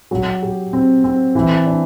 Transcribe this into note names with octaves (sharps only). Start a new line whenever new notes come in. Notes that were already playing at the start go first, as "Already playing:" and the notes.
F#3
G4
C4
C4
E3
D4